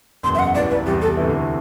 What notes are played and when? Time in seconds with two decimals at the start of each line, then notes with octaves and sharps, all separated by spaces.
0.23 F#1 E2 B2 F#3 C6
0.35 E5
0.39 F#5
0.55 C2 C3 E3 D5
0.70 B4
0.86 E2 C3 G3 G4
1.02 A4
1.17 D2 C3 E3 A3 E4